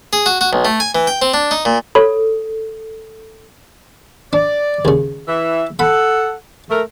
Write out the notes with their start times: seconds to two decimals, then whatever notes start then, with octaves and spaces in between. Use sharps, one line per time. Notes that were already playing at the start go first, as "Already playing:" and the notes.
0.13 G#4
0.26 F#4
0.41 F#4
0.53 B1
0.65 A3
0.80 G#5
0.95 E3
1.07 G5
1.22 C4
1.34 D4
1.51 D#4
1.65 A#2
1.95 A4 C#5 B5
4.33 D4 D5
4.85 D#2 C#3
5.28 E3 E5
5.79 A4 F#5 B5
6.70 A3 A#4